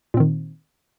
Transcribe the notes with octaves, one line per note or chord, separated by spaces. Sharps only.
A#2 D#3 C4